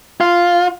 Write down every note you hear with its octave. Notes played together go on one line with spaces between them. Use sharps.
F4